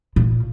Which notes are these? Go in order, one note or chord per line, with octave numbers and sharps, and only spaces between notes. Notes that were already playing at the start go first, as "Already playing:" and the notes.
A#2